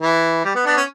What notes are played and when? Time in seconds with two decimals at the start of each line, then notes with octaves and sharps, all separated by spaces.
0.01 E3
0.44 G3
0.55 B3
0.66 B3 D4
0.77 C#4